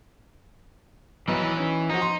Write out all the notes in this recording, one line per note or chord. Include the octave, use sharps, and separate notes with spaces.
B1 E3 F#3 B4 D#5
C#4 D#4
F3 D#4 F#4
C6